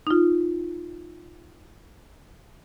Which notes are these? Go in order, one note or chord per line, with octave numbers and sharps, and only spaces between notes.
D#4 F4